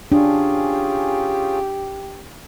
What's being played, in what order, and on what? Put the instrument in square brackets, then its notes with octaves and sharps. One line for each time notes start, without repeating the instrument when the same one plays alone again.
[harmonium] C#4 F4 G#4 [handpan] D4 [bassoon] G4